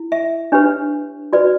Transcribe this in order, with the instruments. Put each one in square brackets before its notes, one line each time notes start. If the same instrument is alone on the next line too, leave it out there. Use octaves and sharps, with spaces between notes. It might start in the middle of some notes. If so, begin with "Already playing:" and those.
Already playing: [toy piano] E4
E5
D4 G4 B4 C#5
F#4 B4 D5